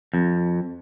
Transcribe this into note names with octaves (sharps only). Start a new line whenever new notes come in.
F2